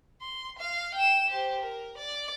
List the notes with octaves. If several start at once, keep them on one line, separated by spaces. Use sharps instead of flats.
C6
F5
G5 E7
G4 C5
A#4
D5